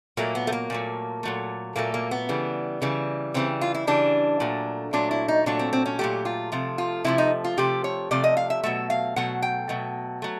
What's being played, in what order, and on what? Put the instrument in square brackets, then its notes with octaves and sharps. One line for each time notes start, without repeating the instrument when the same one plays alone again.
[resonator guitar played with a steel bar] A#2 F#3 A3 A#3
B3
A3
A#3
A#2 F#3 A3
A#2 F#3 A3
A#2 F#3 A3 A#3
A#3
B3
C#3 E3 G3
C#3 E3 G3
C#3 E3 G3 C4
F4
E4
C#3 E3 G3 D4
A#2 F#3 A3
A#2 F#3 A3 D4
E4
D#4
A#2 F#3 A3 D4
C4
C4
C#4
A#2 F#3 A3 G4
F4
C3 F3 A3
F4
C3 F3 A3 E4
D#4
F4
C3 F3 A3 G4
C#5
C3 F3 A3 D5
D#5
F5
E5
B2 F#3 A3 E5
F5
B2 F#3 A3 F#5
G5
B2 F#3 A3
F#3 A3